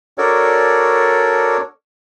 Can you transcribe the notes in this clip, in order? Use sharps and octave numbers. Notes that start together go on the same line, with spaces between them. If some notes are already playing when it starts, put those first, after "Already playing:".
D4 F#4 A4 A#4 C#5 D5